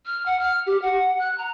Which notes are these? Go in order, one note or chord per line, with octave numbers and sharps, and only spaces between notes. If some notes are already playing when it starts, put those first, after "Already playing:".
F6
F#5
F6
G4
F#5
F#6
A#5